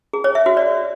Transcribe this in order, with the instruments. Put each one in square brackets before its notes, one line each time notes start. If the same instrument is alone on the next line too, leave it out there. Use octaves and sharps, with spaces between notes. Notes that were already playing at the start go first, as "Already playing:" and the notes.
[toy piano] G#4
C#5
E5
F#4
D5